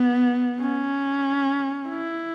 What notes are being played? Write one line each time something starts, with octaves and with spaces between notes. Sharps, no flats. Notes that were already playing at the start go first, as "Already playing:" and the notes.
Already playing: B3
C#4
E4